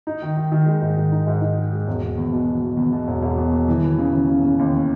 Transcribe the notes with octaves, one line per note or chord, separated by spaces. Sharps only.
D#4
D#3
D#3
D#3
G#3
G#2
D#3
D#4
G#2
D#4
G#3
G#3
E1
E1
E2
B2
E2
B2
E2
B2
E1
E1
B2
B2
E3
E3
C#3
C#3
C#3
C#3
D#2